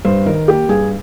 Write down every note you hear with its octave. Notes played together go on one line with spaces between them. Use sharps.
G2 C5
D#3 A#4
A#3 G4
G2 G#4